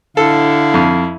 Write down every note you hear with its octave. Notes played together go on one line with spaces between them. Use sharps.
D3 E4 A4 F5
F2